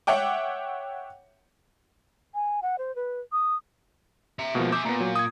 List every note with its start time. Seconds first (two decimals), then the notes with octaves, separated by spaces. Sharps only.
0.07 C#5 E5 F#5 G5 D6
2.34 G#5
2.62 F#5
2.78 C5
2.96 B4
3.32 D#6
4.39 E5 A#5
4.55 B2 F3 G#3 A#3
4.72 G#4 E5 D6 G6
4.85 A#2 B3 A#5
5.00 F#3
5.16 D#6 G#6